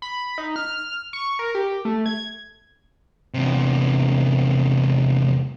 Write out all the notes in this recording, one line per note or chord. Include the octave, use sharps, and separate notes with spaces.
B5
D#4
F6
C#6
A#4
G4
A3
G#6
E2 C3